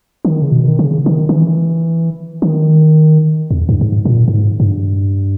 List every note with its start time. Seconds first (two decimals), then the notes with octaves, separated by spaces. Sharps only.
0.25 D#3
0.42 C#3
0.52 B2
0.68 D#3
0.79 C#3
1.06 D#3
1.29 D#3
1.34 E3
2.42 D#3
3.51 E2
3.69 G2
3.81 G2
3.86 G#2
4.05 A#2
4.28 G2
4.32 G#2
4.60 G2